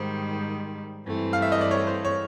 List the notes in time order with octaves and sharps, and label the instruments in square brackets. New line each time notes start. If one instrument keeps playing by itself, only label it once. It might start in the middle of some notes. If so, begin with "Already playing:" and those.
Already playing: [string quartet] G#2 D#3 G3 [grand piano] C5
[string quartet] G2 E3 A3 C4
[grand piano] F5
E5
D#5
D5
C#5
C5
C#5